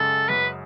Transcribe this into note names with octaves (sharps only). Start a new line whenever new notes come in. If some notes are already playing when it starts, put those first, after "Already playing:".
Already playing: F#2 C#3 G#3 C#4 G#4 A4
F#2 B4